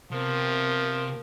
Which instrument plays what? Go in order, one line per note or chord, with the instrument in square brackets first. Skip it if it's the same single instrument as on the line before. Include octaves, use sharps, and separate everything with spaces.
[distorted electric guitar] C3 [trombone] F3 [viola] B3 A#4